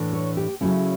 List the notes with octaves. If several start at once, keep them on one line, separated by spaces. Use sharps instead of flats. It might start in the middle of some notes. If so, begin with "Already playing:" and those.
Already playing: A2 E3 A3 D4
C#5
G4
C#3 F#3 A3 C#4 E4